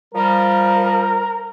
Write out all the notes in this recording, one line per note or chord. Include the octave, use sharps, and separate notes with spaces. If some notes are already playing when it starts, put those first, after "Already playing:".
F3 G3 A#4